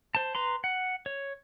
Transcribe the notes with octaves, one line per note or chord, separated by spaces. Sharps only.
C5 A5
B4 A#5 C6
F#5
C#5